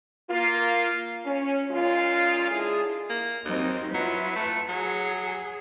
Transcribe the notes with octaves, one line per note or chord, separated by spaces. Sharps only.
A#3 F4
C#4
A#2 G#3 C#4 F4
D3 G#3 E4 G#4
A#3
D#2 F#3 C4 D#4
F#3 E4 F4 B4
A3
F#3 G#4